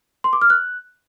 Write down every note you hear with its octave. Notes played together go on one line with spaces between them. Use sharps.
C6
D6
F6
F#6